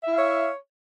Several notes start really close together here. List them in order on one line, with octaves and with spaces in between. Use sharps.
E5 E4 F5 C#5